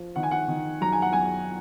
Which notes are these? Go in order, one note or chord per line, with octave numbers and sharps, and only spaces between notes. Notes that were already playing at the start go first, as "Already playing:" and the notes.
Already playing: F3
D#3 F#5
G#5
F#5
D#3
F#2 A#5
G#5
F#5
F#2 G#5